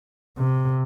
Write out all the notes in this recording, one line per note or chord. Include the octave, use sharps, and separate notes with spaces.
C3